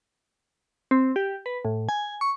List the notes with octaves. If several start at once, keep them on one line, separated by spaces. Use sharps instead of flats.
C4
G4
B4
A2
G#5
C#6